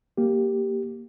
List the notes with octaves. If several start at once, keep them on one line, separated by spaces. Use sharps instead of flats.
A#3 G4